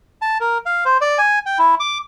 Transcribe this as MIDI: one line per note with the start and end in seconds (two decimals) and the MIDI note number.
0.22 0.38 81
0.40 0.58 70
0.66 0.84 77
0.85 0.98 72
1.01 1.18 74
1.18 1.39 80
1.46 1.58 79
1.58 1.75 64
1.80 1.98 86